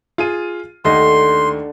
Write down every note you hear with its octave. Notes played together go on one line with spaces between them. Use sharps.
F4 G#4 D#7
D#2 D3 A3 D#5 C6